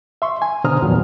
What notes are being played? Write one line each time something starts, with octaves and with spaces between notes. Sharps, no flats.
E5 C6 C#6
G#5
B2 D3 C5 A#5 D#6 F6
E2 A#2 D#3 F3 F#3 B3